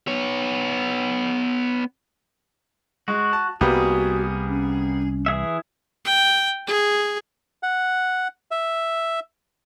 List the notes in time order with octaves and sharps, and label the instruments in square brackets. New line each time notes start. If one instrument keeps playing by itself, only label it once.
[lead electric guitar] B3 C#5
[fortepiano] G#3 [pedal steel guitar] F#4
[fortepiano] A5
[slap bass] C2 [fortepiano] G3 A#3 B3 [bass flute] F#4 [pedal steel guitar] G#4
[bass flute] C#4
[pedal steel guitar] E3 G#4 E5
[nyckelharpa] G5
G#4
[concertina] F#5
E5